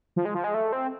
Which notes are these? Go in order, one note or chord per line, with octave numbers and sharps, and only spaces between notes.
F3
G#3
F3
G#3
A3
C4